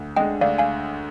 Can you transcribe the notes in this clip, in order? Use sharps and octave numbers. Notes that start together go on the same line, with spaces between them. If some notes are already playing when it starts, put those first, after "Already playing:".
Already playing: D2
D3 G#3 D#5 G5
D2 D5 F5
F5 G#5